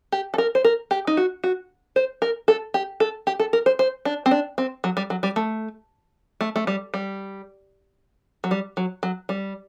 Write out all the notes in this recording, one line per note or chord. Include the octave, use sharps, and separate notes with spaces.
G4
A4
A#4
C5
A#4
G4
D#4
F#4
F#4
C5
A#4
A4
G4
A4
G4
A4
A#4
C5
C5
D4
C4
D4
C4
F#3
G3
F#3
G3
A3
A3
A3
G3
G3
F#3
G3
F#3
F#3
G3